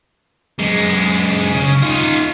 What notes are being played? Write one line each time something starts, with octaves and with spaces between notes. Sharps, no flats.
F#2 G#3
C#3
D#4 F4